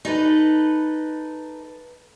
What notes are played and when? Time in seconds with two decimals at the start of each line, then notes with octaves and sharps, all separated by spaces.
0.05 D#4 A4 B4